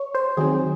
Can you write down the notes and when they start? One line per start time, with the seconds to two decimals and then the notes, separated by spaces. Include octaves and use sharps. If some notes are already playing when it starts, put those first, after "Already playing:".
Already playing: C#5
0.15 C5
0.37 D#2 D#3 F#3 C4 G#4